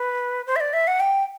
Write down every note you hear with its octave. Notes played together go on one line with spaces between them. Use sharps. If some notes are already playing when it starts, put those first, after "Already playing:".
Already playing: B4
C5
E5
D5
E5
F#5
G5